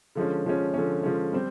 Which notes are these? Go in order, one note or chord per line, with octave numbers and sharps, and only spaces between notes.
D3 F3 G#3 C#4
D3 F3 G#3 C#4
D3 F3 G#3 C#4
D3 F3 G#3 C#4
G3 C4